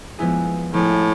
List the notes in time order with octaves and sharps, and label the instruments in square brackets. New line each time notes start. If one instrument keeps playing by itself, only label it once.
[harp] F3 G#3 B3 E4 G#4
[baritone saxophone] A2 [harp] F3 G#3 B3 E4 G#4